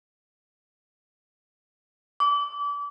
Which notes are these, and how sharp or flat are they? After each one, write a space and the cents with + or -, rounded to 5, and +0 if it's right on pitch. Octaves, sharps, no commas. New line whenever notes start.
D6 -30